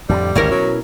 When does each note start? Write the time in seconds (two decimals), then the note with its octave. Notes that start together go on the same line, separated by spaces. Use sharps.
0.09 F2 A2 D3 G3
0.35 G#1 D2 C#4 E4 A#4
0.51 B2 F#3